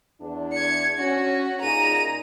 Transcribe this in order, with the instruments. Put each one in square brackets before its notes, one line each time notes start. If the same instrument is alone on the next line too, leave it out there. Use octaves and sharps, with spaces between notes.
[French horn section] E2 D4
[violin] G#6 C#7
[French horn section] C#4 [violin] F#4
[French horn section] A#2 D#4 G#4 [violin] A#5 D#7